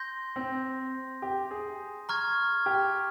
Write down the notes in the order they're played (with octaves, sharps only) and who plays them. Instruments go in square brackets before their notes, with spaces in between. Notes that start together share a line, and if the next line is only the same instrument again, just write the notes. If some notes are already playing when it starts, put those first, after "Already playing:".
Already playing: [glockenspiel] C6 G6 A#6
[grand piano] C4
G4
G#4
[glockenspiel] A#5 C#6 F6 G#6
[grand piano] G4